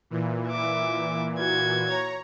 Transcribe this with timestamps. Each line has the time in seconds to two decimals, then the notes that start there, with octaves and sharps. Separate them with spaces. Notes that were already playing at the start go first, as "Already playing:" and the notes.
0.10 A#2 E3
0.49 E5 D6
1.39 F#4 G#6
1.87 C#5 A#5